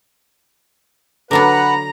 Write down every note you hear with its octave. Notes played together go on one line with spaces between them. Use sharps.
D3 F#3 D4 B4 F#5 A#5